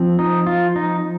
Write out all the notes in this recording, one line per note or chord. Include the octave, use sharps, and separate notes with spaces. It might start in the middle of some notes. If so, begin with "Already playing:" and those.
Already playing: F3 C4
D#4
F4
D#4